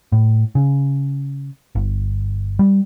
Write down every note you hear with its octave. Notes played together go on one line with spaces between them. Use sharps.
A2
C#3
G1
G3